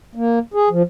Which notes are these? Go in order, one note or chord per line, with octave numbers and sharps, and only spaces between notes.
A#3
G#4
F3